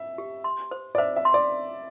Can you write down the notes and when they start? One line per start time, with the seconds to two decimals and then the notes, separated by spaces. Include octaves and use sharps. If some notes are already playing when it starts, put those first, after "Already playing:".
Already playing: E5
0.18 G4
0.44 C6
0.71 C5
0.95 D5
0.98 C5 E5
1.16 E5
1.25 C6
1.34 D5